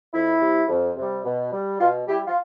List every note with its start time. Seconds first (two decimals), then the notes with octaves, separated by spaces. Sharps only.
0.12 F2 E4
0.40 C3 G3
0.68 F2
0.96 C3 G3
1.24 B2
1.51 G3
1.79 B2 F4
2.07 G3 E4 G4
2.26 F4